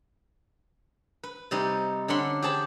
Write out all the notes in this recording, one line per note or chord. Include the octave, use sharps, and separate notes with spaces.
B4
C3 G3 D#4 B4
D3 C#4 D4 F#5 B5 C6
G4 G#4 C5 A5 B5